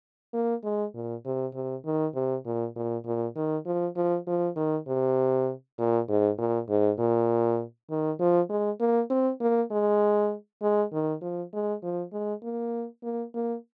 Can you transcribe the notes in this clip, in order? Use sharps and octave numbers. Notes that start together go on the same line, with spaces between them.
A#3
G#3
A#2
C3
C3
D#3
C3
A#2
A#2
A#2
D#3
F3
F3
F3
D#3
C3
A#2
G#2
A#2
G#2
A#2
D#3
F3
G#3
A#3
C4
A#3
G#3
G#3
D#3
F3
G#3
F3
G#3
A#3
A#3
A#3